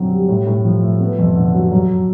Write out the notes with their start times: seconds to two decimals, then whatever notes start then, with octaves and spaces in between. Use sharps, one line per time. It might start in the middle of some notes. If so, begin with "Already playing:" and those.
Already playing: F#2 D3 C4
0.11 G3
0.28 A2
0.46 A2
0.65 F3
0.83 A3
1.00 B3
1.19 F2
1.36 D3
1.54 F#3
1.72 F#2